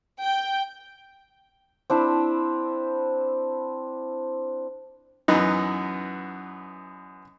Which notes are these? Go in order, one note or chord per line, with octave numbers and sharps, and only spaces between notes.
G5
C4 D4 E4
F#2 E3 B3 D#4